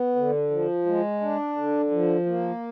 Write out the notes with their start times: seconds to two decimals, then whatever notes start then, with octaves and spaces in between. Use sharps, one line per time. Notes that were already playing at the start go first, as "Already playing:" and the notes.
Already playing: B3
0.16 D3
0.50 F3
0.86 G#3
1.21 D4
1.56 D3
1.91 F3
2.26 A#3